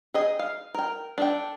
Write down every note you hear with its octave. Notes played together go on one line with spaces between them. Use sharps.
G#4 D#5 G5
F5
A#4 G5
D4 A4 G5